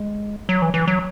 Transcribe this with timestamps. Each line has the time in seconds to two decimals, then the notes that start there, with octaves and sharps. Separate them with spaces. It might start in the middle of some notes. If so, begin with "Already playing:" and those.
Already playing: G#3
0.49 F#3
0.62 E3
0.74 E3
0.88 F#3